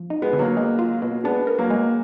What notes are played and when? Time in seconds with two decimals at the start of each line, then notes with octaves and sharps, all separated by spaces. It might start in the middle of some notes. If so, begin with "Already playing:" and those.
Already playing: F3
0.10 D#4
0.22 G#3 B3
0.33 D3
0.39 F#3 A#3
0.57 G#3
0.79 F4
1.02 B2
1.24 G#3 B3 D4
1.47 A#4
1.58 F#3 A#3
1.70 G#3